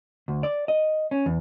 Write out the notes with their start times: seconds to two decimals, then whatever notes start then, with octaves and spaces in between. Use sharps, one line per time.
0.28 D2
0.43 D5
0.68 D#5
1.11 C#4
1.26 E2